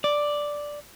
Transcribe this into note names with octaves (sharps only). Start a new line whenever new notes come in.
D5